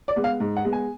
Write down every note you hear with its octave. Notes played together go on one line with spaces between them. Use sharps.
D5
G#3 B3
F5
G#2
F#5
G#3 B3
G#5